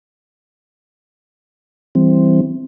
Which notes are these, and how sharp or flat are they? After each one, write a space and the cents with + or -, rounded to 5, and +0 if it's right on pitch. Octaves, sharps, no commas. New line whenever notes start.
E3 +0 G3 +0 C4 -5